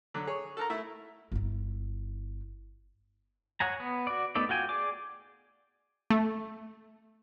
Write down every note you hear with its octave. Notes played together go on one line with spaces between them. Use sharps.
D3 F#3
G#4 C#5
A4 A#4 A#5
A3 E4 E5
G1 E4
C#5 F#5 G#5 A#5
B3
F#4 D5
A3 B3 D#4 A4 D5
F4 F#4 G5 G#5
G#4 D5 D6
A3